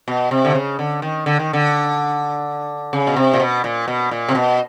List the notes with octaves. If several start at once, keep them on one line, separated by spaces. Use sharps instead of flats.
B2
C3
D3
C#3
D3
D#3
D3
D#3
D3
C#3
B2
C3
A#2
B2
A#2
B2
A#2
C3
B2